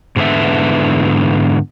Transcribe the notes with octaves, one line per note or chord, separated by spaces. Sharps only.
G#2 D3 E3 B3 E5